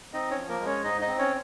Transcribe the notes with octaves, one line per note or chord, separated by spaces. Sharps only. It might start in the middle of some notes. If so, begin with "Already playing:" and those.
C4 D#4 D#5
C#4 C#5
F3
A#3 A#4
G#3
C#4 C#5
G#2 D#4 D#5
D#4 D#5
C4
C#4 C#5